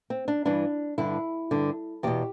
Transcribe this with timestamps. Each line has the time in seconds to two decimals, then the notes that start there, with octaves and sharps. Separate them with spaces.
0.10 C4
0.28 D4
0.45 G2 E3 D4
0.98 G2 D3 E4
1.51 G2 D3
2.03 E2 B2 G4